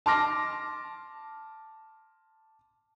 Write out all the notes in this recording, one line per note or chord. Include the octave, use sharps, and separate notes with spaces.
A5 C6 D6 F6 A#6